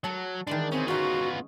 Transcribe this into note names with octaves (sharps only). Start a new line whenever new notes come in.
F#3 A4 A5
D#3 E3 G#3 D4
C4 C#4 G#4
B3 C#4 D#4 F4 F#4